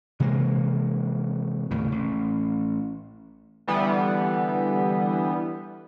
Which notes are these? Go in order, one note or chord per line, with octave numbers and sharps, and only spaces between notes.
C3 E3 G#3 A#3
D#2 A2 C#3
A1
D3 E3 G3 B3